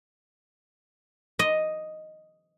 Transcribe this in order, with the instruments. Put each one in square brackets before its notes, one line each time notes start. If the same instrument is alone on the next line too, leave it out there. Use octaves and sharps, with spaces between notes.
[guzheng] D#5